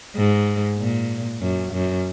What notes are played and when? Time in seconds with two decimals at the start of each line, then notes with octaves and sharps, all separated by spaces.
0.16 G#2
0.78 A#2
1.41 F#2
1.73 F#2